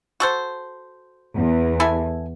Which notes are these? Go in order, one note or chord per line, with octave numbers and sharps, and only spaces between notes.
F#4 A4 C5
E2
E4 A4 G#5